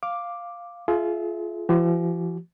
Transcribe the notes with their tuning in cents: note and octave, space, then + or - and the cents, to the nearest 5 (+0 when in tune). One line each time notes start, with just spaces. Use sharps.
F5 +0 D6 +0
F4 -10 G#4 +35 E5 +0
F3 -45 F#4 +45